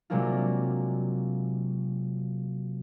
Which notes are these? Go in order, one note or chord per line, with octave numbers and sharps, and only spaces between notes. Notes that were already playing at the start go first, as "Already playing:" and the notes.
C3 F#3 G#3 A#3 D4 F4